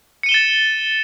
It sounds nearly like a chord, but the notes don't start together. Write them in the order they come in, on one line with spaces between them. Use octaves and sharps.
C#7 D#7 G7 E7 A6